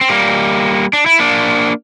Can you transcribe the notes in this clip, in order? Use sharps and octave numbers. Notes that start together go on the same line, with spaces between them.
C4
G3 A#3
D4
E4
A#3 D4